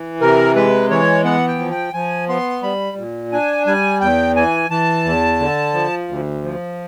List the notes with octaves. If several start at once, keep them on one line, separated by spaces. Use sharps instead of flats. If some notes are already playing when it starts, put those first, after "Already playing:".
Already playing: E3
C3 A#4
G#3 B4
E3 C#5
B3 F#5
G5
F3
G5
F3 G#5
B3 C6
G3 B5
A#2
D4 G#5
G3 G#5
E2 G5
E3 G#5
E3 A5
E2
D3
F3
D2
F3